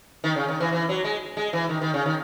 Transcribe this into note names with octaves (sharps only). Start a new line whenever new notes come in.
D#3
C#3
D#3
E3
E3
F#3
G#3
G#3
E3
D#3
D#3
C#3
D#3